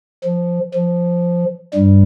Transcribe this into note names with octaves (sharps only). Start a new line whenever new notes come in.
F3
F3
G2 G3